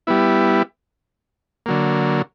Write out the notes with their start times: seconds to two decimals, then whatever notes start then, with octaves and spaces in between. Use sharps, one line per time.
0.07 G3 B3 E4
1.66 D3 F#3 A#3